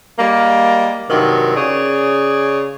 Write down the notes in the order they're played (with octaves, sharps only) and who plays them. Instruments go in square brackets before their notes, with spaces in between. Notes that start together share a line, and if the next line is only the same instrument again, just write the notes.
[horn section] G3 G#3 A#3
G2 C3 D#3 F#3
C#3 G#4 C#5 D5